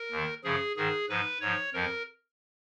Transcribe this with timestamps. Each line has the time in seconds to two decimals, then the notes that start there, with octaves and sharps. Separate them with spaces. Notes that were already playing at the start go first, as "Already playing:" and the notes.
Already playing: A#4
0.11 D#2 D#3
0.43 F#2 C#3 F3 G#4
0.76 G#2 D#3 G#4
1.09 G#2 F3 B4
1.41 G#2 F3 C#5
1.73 F2 F3 A#4